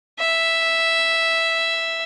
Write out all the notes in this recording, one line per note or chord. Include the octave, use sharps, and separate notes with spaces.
E5